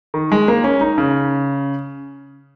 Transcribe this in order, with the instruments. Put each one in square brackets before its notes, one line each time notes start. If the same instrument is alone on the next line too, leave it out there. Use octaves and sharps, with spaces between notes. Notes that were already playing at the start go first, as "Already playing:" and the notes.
[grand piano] D#3
G#3
A#3
C#4
D#4
C#3